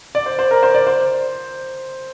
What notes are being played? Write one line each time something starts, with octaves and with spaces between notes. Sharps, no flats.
D5
C5
C5
A#4
C5
D5
C5